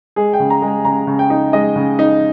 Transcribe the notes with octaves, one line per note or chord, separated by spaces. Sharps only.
G#3 G#4
G5
C#3
A#5
G#3
G#5
C#3 A#5
C#3
G5
D#4
G#3 D#5
C#3
D#4